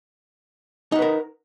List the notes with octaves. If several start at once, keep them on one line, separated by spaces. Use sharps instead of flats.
D#4 A#4 B4 F#5